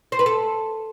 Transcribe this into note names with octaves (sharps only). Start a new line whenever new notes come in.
C5
B4
A4